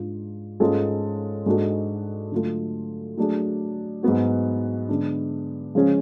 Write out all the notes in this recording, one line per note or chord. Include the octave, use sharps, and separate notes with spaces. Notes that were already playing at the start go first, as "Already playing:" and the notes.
Already playing: G#2 G#3 D4 F4
G#2 G#3 C#4 F4 A4
G#2 G#3 D4 F#4 A4
D3 F#3 A3 F4 A4
F#3 A3 D4 G#4
G#2 F#3 B3 F#4
D3 G#3 B3 D4
C#3 F3 G#3 C#4 G#4